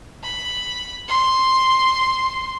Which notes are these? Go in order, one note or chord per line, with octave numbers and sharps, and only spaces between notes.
B5
C6